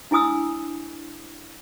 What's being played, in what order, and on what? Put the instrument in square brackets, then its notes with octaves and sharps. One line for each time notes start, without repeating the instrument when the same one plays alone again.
[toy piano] D4 E4 G#5 D#6 E6